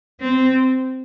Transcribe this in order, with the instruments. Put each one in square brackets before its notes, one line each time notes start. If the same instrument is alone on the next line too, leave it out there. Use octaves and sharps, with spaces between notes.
[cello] C4